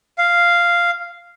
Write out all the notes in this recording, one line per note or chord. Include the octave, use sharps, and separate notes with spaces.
F5